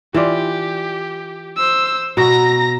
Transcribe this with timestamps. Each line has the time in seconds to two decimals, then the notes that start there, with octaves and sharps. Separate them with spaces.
0.14 E3 F4 G4 D5
1.56 C5 E6
2.17 B2 F#4 A#5 A#6